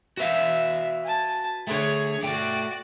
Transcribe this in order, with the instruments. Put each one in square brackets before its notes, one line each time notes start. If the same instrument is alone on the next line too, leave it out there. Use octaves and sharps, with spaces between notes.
[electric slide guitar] F#4 B4 F5 [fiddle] E5
[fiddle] G#5 A5
[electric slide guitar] D3 A3 [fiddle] G#4 C#5
[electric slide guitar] A3 G5 [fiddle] F#4 D5